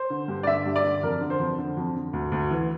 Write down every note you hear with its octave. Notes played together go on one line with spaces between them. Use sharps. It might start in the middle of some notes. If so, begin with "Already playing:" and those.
Already playing: C5
D3
G2
D5
D3 E5
G2
D5
D3
F2 A#4
D3
C5
F2
D3
F2
D3
D2
D2
E3